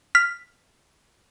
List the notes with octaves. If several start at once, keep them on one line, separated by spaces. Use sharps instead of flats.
F6 B6